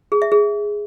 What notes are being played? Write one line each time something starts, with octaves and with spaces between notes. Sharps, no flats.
G#4
E5
G#4